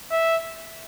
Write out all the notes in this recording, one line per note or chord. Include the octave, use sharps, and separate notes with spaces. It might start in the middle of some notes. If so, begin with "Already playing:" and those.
E5